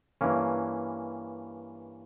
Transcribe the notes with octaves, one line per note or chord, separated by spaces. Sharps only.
G2 E3 A#3 C#4